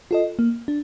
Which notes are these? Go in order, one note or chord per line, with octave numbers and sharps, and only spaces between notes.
F4 A4 D#5
A#3
D4